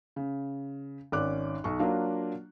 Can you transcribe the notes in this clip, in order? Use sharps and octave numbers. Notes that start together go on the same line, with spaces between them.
C#3
G#1 C#4 D5 D6 F#6
B1 C#6
F#3 A#3 D4 F4